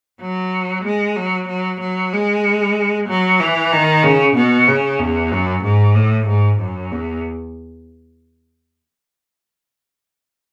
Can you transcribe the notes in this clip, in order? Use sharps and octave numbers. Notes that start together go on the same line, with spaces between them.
F#3
G#3
F#3
F#3
F#3
G#3
F#3
E3
D#3
C#3
B2
C#3
E2
F#2
G#2
A2
G#2
F#2
E2